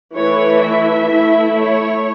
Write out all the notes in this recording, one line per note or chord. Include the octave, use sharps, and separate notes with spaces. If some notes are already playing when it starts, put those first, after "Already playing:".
E3 A3 E4 C#5
E5
A3 E4
C#5